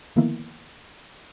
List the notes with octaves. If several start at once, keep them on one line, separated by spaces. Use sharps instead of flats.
D3 D#3 F3 A#3 B3 E4